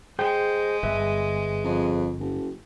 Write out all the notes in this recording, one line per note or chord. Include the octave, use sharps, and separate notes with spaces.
G#3 G#4 C5 G5
G1 G#4 B4 E5
F2
F#1